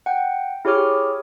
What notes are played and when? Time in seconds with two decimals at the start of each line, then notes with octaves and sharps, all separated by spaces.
0.06 F#5 G5
0.65 E4 G4 G#4 C#5 D6 F6